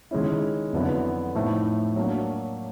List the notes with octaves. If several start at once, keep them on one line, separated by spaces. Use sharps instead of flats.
D#3 G#3 C#4 E4
F2 D3 F#3 B3 E4
A2 F3 A3 C4 D#4
F#3 A#3 D4